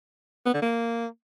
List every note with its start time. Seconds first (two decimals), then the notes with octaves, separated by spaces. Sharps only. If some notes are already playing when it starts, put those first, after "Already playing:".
0.46 B3
0.54 D3
0.62 A#3